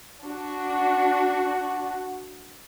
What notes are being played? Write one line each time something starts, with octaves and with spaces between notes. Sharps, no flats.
D4 F#4